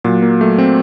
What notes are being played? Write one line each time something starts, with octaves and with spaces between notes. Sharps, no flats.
A#2 F#3 F#4
A#3
A3
C4